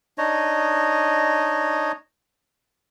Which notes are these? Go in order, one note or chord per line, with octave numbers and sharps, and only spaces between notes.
D4 D#4 C#5 D#5